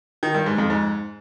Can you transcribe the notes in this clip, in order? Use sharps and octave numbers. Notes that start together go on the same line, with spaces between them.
D#3
G2
G#2
F2
G#2